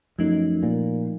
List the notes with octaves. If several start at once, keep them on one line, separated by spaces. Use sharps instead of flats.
F#2 F3 A3 D#4
A#2